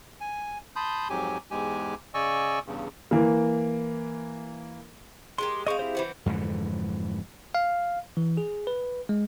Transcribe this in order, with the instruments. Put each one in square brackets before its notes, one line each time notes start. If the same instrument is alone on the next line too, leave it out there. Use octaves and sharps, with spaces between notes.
[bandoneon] G#5
A5 B5 C6 D#6 G6
F2 G#2 F#3 G4 G#5
E2 G#2 G#3 G4 G#5
C#3 D5 D#5 G#5 C#6 E6
E2 G2 C#3
[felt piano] E3 A#3
[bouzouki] G#3 G4 A#4 [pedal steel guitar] C6
[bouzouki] G#3 C4 F5 [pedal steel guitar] D#5 C#6
[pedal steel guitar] E4 G4 C5
[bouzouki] E3 C4 F#4
[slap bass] F2 G#2 D3 E3
[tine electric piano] F5
E3
G#4
B4
G#3